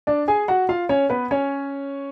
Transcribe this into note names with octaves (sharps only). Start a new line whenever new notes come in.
D4 D5
G#4 G#5
F#4 F#5
F4 F5
C#4 C#5
B3 B4
C#4 C#5